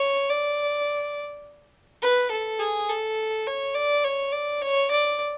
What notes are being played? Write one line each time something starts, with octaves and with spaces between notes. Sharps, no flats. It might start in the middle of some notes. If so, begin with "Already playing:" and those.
Already playing: C#5
D5
B4
A4
G#4
A4
C#5
D5
C#5
D5
C#5
D5